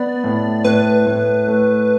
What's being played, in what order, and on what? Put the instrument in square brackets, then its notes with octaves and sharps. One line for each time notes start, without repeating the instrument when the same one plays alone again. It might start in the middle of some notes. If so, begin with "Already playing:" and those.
Already playing: [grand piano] B3 [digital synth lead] D5
[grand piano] A2
[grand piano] A2 [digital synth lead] B4
[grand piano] A2
A3